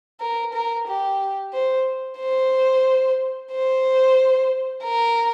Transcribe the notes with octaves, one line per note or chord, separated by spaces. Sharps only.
A#4
A#4
G4
C5
C5
C5
A#4